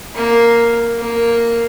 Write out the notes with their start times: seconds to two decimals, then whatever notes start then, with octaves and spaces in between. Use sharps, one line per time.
0.16 A#3
0.99 A#3